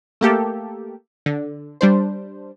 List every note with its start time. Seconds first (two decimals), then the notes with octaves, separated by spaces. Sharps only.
0.21 A3 A#3 G4 A4
1.26 D3
1.81 G3 D4 C5